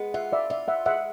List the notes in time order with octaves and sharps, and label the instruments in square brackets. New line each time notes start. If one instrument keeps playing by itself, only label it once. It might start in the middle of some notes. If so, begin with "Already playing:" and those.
Already playing: [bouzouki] G#3 B3
[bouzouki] F4 [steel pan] E5 F#5
[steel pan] D5 E5
[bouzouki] F4 [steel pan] D5 E5
[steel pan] E5 F#5
[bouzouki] G#3 [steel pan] E5 F#5